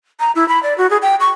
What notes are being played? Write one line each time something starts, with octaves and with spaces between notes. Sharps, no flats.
A#5
E4
B5
D5
F#4
G#4
G5
C#6